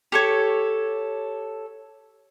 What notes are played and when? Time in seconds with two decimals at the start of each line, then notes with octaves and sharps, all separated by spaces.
0.12 G4 A4 C#5